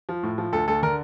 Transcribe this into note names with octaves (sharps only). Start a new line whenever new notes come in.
F3
A2
F3
D2 A4
D2 A4
D3 A#4